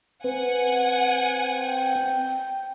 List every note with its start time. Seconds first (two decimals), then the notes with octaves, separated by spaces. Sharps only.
0.24 C4 B4 F#5 G#5
1.58 G5